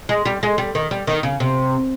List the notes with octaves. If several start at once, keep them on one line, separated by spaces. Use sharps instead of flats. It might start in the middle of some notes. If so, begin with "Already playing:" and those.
G#3
G3
G#3
G3
D#3
G3
D#3
C#3
C3